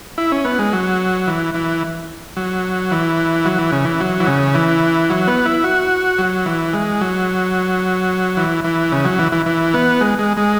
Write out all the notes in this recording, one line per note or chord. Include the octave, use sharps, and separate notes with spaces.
E4
C#4
B3
G#3
F#3
E3
E3
F#3
E3
F#3
E3
C#3
E3
F#3
E3
C#3
E3
F#3
B3
E4
F#4
F#3
E3
G#3
F#3
E3
E3
C#3
F#3
E3
E3
E3
B3
G#3
G#3
G#3